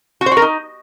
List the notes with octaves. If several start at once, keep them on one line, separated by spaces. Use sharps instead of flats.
F#4
C5
F#4
A#4
D#4